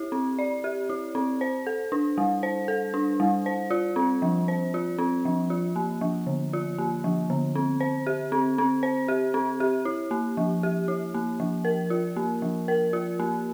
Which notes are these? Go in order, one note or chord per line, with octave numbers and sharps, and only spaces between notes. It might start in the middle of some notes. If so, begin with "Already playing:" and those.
Already playing: E4 G4
C4
D5
G4
E4
C4
C5
A4
D4
G3
C5
A4
D4
G3
C5
F4
C4
F3
C5
F4
C4
F3
F4
A#3
F3
D3
F4
A#3
F3
D3
C4
C5
G4
C4
C4
C5
G4
C4
G4
E4
A#3
F3
G4
E4
A#3
F3
A#4
F4
A#3
F3
A#4
F4
A#3